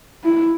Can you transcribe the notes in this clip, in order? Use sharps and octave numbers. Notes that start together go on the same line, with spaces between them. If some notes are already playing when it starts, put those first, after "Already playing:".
E4